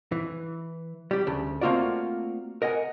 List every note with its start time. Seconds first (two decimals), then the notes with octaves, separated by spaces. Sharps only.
0.12 E3
1.11 G3 G4
1.27 D2 C#3
1.61 A3 A#3 C4 F4 F#4 D5
2.62 A#4 D#5 F#5 G#5